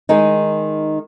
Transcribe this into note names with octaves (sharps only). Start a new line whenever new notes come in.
D#3 G#3 D#4